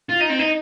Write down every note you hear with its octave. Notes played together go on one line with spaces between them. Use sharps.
F4
D#4
C4
D#4